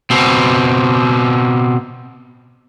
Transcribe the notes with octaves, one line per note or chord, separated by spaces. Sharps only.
B2 C4